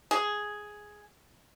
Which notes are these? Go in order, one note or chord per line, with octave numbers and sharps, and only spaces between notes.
G#4